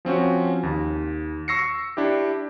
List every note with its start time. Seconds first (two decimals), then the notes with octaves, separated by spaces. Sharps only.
0.05 F3 C4 C#4 F#4
0.63 D#2
1.48 C#6 E6 A#6 C7 C#7
1.97 D4 E4 G4